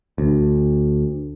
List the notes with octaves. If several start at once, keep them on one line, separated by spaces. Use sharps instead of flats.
D2